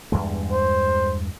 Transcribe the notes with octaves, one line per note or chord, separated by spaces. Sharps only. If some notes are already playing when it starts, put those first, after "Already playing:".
E2 G2 G#3
C5